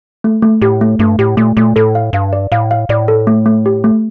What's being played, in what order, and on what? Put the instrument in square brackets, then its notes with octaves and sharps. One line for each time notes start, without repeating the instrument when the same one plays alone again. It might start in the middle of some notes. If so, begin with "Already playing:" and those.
[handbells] A3
A3
[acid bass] A2 [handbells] G4
[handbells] A3
[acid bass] G2 [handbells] A3
[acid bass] A2 [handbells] G4
[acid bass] A#2 [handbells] A3
[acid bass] A#2 [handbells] A3
[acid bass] A2 [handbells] A4
[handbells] F5
[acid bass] G2 [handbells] F5
[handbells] D5
[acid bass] A2 [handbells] F5
[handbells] F5
[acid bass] A2 [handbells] D5
[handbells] A4
A3
A3
G4
A3